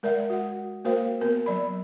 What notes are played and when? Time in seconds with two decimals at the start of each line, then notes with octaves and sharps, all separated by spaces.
0.03 G#3 A#4 D5 E5 F#5
0.30 F#4 F#5
0.85 A#3 F#4 A#4 C5 F5
1.21 B3 A#4
1.46 F#3 D5 B5